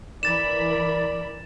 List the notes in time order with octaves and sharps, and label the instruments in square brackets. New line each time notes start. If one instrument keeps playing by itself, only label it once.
[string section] E3 A#4 B5 [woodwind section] D5 [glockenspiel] A6 E7